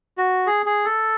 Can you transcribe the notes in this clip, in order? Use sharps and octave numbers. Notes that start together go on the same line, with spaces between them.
F#4
G#4
G#4
A4